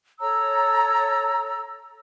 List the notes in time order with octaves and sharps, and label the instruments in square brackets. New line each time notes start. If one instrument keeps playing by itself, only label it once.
[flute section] A4 C#5 A#5 E6